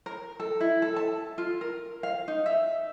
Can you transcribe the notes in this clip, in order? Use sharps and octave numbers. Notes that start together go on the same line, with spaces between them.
A#4
A4
E4
A4
A5
F4
A#4
F5
D#4
E5